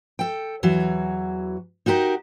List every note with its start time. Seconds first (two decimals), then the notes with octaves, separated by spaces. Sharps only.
0.19 A4 G5
0.63 E2 E3 F#3 F#4
1.86 D#4 F#4 G4 A4 A#4